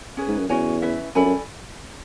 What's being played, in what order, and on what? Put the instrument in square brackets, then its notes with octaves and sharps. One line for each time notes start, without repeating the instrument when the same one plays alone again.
[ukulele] C#4 G#4 B4
[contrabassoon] G#2
F#2
[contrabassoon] E2 [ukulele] C#4 F#4 C#5 G#5
[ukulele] C#4 E4 B4 E5
[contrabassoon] F#2 [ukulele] A4 D5 G#5 B5
[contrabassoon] F#2